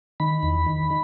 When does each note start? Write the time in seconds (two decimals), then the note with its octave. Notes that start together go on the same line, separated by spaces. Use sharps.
0.20 D#3 B5
0.43 E2
0.67 D#3